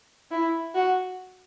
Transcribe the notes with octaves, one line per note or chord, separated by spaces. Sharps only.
E4
F#4